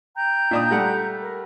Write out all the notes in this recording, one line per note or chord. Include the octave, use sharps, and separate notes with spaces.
G5 A#5 G6
A#2 D4 D#6
G3 A3 F#5
A#4